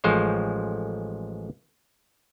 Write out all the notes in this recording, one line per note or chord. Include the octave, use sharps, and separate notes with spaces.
A1 F3 G#3 C5 C#5